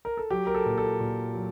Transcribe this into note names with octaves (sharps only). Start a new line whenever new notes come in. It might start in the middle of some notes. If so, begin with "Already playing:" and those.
A#4
A4
F#3 G4
A#4
A4
A#2
A4
A#2
F#3